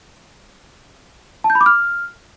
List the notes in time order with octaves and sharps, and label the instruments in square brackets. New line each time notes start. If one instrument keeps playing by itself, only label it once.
[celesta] A5
G6
B5
D6
F6